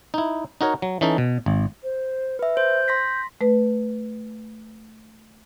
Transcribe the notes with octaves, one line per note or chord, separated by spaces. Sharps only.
D#4 E4
D#4 F#4 A#4 C#5
F#3
E3 C#4 D#4 A4
B2
G#1
C5
B4 E5
C5 G6
C6 A#6 B6
A3 B4